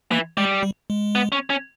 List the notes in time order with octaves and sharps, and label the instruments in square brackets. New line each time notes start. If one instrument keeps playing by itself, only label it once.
[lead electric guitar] E3 [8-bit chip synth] A#3
[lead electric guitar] G3 [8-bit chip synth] G#3
[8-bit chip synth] G3
G#3
[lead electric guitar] B3
C#4
C#4